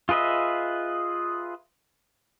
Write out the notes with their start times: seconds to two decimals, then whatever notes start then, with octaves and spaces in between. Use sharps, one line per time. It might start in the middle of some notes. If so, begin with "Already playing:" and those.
0.09 F4 G#4 B4 D#5 E5